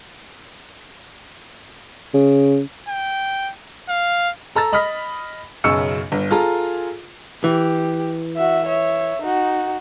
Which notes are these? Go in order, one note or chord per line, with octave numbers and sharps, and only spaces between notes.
C#3
G5
F5
A4 A#5 E6 A6
D#5 B5 D#6 F6 B6
B1 F#2 C#3 C#6 E6 C#7
G1
F4 G#4 A4 A#5
E3 G4
F#4 E5
C#5 E5
D#4 F#4